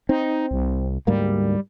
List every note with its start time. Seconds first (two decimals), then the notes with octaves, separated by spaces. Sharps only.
0.09 C4 D#4
0.51 C2
1.07 D2 G#2 G3 A#3